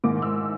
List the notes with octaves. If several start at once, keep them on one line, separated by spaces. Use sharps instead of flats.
G#2 D#3 G#3 D6
E6